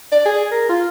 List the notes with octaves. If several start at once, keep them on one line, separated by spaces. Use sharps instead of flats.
D5
G#4
A#4
F4